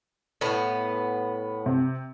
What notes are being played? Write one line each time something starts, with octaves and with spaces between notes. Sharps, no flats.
A2 B3
C3